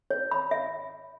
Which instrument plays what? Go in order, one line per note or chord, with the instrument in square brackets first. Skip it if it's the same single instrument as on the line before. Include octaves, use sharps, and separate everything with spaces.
[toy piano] C#5
B5
E5